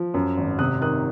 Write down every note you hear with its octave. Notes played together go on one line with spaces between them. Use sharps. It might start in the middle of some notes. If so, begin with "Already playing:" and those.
Already playing: F3
F#2
G#1
C3 D#6 F#6
D#3 D#6 F#6